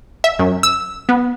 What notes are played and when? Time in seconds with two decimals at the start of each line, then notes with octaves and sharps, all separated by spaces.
0.24 E5
0.39 F#2
0.63 E6
1.09 B3